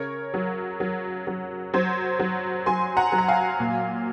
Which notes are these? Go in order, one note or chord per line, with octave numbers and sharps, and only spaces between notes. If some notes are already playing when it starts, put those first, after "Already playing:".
Already playing: C#3 A#4 C#5
F#3
F#3
F#3
F#3 C5
F#3
F#3 G#5 C6
F#5 A#5
F#3
A#5
F5 G#5
A#2